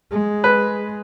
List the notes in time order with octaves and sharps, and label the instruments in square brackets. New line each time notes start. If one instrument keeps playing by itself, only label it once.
[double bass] G#3
[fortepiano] B4